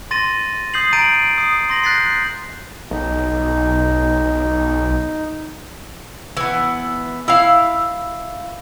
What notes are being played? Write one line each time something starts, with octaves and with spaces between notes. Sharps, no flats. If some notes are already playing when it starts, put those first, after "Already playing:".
C6 A6 A#6 D#7
D#6 G6 C7 F#7
A#5 G6 A6 D7 D#7 F#7
D#6 C7
C6 A#6 F#7
F#6 G6 A6 B6 C7
B1 D#4
E3 B3
E4 F5